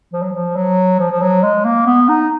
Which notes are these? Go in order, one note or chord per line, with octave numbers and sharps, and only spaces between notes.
F3
F#3
F3
F#3
F3
F3
F#3
G#3
A#3
B3
D#4